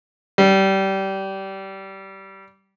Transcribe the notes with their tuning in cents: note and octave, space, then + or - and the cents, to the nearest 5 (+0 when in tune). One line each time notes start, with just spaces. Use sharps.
G3 -20